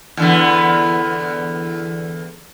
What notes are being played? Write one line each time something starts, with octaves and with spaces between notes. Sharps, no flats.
E2 D3 B3